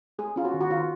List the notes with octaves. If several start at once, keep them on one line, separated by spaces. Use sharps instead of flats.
G#3 G#4
C#4 F4
F#4
D#3
F#4
D#3 F4